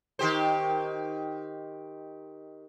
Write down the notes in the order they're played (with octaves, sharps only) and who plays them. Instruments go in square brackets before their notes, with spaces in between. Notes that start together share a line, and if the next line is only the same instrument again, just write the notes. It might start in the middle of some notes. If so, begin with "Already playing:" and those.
[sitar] D#3 G4 C5